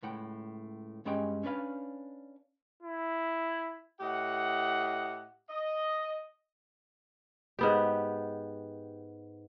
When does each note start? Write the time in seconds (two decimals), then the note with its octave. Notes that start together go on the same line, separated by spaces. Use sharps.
0.02 C#2 A2 F#5 G5
1.05 G2 G#3 C#4 G4 G#4 G5
1.43 C#4 D4 B4 F5
2.83 E4
4.00 A2 G4 D#5 F#5
5.49 D#5
7.59 G#2 B3 G4